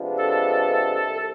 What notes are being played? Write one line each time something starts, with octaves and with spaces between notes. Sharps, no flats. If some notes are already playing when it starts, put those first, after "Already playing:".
Already playing: C3 F3 G#3 B3 D4
A4
C2